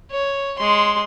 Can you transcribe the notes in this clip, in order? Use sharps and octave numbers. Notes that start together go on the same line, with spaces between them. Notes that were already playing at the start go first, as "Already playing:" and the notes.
C#5
G#3 C6